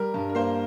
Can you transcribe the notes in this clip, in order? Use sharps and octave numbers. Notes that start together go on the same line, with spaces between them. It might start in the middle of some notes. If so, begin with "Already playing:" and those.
Already playing: G3 A#4
G2
A#4
A#3 C5